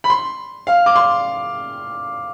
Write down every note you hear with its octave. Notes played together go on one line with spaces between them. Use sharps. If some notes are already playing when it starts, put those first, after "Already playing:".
B5
C6
F5
D6
C6